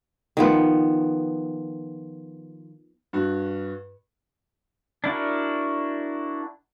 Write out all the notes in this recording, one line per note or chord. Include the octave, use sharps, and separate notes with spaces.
D#3 F3 B3
G2 F#4
D4 E4 F#4 A#4